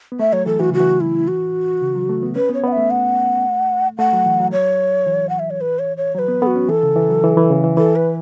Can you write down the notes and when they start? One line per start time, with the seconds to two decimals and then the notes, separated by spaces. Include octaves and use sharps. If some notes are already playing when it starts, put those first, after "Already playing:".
0.12 B3
0.19 A3 E5
0.33 F#3 C#5
0.46 E3 A4
0.60 E3 F#4
0.70 C#3 F#4
0.80 E3
1.01 E4
1.28 F#4
1.82 C#3
1.95 F#3
2.09 A3
2.23 B3
2.36 C#4 B4
2.50 B3 C#5
2.63 B3 F#5
2.72 A3 E5
2.91 F#5
3.98 A3 F#5
4.13 F#3
4.26 E3
4.40 F#3
4.52 C#5
5.07 E3
5.29 F#5
5.39 E5
5.50 C#5
5.61 B4
5.79 C#5
5.97 C#5
6.15 F#3 B4 C#5
6.28 B3
6.42 B3 A4
6.47 F#4
6.56 C#4
6.69 E3 A4
6.83 C#3
6.96 E3
7.09 F#3
7.24 E3
7.37 E3
7.50 C#3
7.64 E3
7.77 E3 A4
7.96 B4